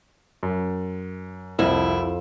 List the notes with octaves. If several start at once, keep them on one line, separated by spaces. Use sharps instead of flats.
F#2
C2 F2 E4